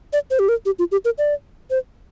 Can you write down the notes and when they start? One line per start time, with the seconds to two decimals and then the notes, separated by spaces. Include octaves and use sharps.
0.13 D5
0.31 C5
0.39 G4
0.49 A#4
0.66 G4
0.79 F4
0.92 G4
1.05 A#4
1.18 D5
1.70 C5